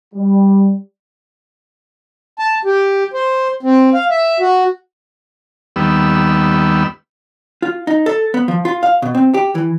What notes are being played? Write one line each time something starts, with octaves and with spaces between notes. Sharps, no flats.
G3
A5
G4
C5
C4
F5
E5
F#4
D#2 G3 B3 E6
F4
D#4
A4
B3
F3
F4
F5
B2
C4
G4
E3